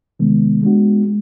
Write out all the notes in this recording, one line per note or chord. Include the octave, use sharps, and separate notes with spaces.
C3 D#3 G#3 B3
G#3 B3 D4 F#4
G#3